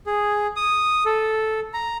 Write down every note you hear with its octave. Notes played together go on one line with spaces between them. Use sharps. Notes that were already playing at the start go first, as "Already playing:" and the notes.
G#4
D#6
A4
A#5